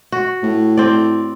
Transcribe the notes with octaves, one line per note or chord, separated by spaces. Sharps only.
F#4
A2
C4 D5